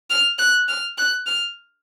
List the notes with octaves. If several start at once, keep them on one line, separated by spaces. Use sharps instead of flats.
F6
F#6
F6
F#6
F6